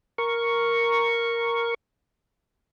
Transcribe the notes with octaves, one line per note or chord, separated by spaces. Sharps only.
A#4 C#6